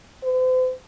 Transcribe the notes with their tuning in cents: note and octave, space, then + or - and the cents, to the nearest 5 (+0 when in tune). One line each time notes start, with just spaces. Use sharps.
C5 -40